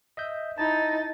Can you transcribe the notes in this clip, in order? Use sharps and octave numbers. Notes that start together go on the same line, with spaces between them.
D#5 E5 G6
D#4 E4 D#5 A5 A6